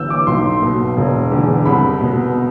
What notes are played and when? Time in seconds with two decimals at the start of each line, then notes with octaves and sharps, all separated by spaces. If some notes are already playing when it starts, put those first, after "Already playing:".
Already playing: G1 G2 E3 E6 G6
0.10 D6
0.27 B1 C6
0.63 B2
0.97 E1
1.32 E2 D3
1.65 C2 B5
2.01 B2